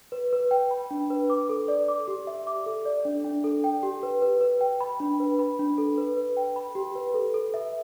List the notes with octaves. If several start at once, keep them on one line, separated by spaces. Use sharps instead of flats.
B4
B4
G5
B5
D4
B4
D6
A4
D5
D6
G4
E5
D6
A4
D5
D4
D4
A4
G5
G4
B4
B4
B4
G5
B5
D4
B4
B5
D4
A4
B4
B4
G5
B5
G4
B4
A4
A4
E5